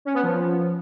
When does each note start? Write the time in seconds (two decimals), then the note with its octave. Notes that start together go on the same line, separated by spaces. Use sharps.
0.05 C#4
0.14 B3
0.23 F3